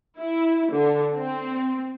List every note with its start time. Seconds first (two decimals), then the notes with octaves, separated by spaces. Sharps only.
0.17 E4
0.71 D3
1.13 C4